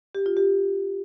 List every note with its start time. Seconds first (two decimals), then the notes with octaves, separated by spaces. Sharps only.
0.15 G4
0.26 F4
0.37 G4